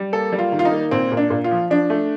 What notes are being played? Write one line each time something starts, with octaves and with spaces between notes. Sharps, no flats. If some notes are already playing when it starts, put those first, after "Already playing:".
Already playing: G3
A#3 A4
G3
F4
D#3
F4
D#4
A#3
A#2 C4
A#2
D4
A#2
F4
F3
F3 D4
A3